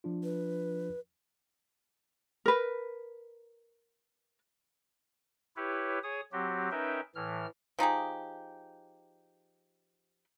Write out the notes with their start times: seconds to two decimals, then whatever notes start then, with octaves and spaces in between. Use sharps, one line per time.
0.04 F3 D4 F4
0.24 B4
2.46 A#4 B4
5.57 E4 G4 B4 C#5
6.03 G#4 C#5 D#6
6.32 F#3 C4 F#4 G4
6.71 C#4 D#4 A#4 B4 E5 G5
7.15 A2 E3 F6
7.79 F3 D#4 G4 G#4